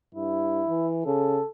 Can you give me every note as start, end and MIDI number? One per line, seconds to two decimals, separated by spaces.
0.15 0.63 43
0.15 0.89 64
0.68 1.03 52
1.06 1.39 49
1.06 1.48 69